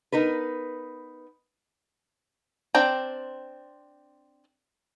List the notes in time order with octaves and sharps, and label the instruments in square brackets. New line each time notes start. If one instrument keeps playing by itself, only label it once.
[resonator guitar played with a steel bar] B3 D#4 A#4 B4
[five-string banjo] C4 D4 G5 A#5